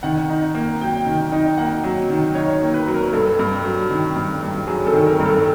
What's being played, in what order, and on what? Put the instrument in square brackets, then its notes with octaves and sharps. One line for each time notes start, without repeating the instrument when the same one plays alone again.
[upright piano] D#3 F#5
D#4
A#3
F#3 G5
D#3
D#4
A#3 F#5
F#3
D#3
D#4 C#5
A#3
B4
F#3
A#4
G2 A4
G2
F#3
D#3
G2
G2
F#3 G#4
A4
D#3
A#4
G2
A4